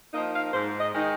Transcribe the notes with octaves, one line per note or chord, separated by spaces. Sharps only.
F3 A#3 D#4 D#5
F5
G#2 C5
D#5
D#3 G#3 D#4